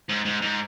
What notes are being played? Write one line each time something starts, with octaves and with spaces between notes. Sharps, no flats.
G#2
G#2
G#2